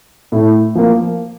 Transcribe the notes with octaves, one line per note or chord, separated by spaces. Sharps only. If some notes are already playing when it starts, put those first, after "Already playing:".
A2
F3 A#3